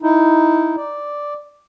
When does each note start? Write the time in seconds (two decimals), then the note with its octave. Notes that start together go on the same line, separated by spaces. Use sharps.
0.02 D#4 E4
0.77 D5